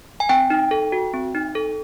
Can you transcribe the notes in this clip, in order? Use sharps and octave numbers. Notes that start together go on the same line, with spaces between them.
G#5
C4 G5
D#4
A4
F#4
C4
D#4
A4